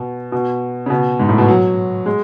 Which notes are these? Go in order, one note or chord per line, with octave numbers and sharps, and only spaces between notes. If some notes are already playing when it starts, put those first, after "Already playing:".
Already playing: B2
B2
C#3
B2
G#2
A2
B2
F#3
G#3